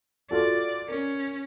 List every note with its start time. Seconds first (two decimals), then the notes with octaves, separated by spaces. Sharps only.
0.31 F4 F#4 A4 D5
0.88 C#4 A#4